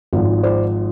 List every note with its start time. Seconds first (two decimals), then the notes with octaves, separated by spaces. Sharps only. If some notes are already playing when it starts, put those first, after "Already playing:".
0.13 G#1 G#2 F3
0.43 C5 D5